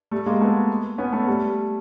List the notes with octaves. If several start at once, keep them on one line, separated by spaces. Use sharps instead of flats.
G3 A3
G#3 A#3
A3 B3
B3 C#4
A3 B3
G3 A3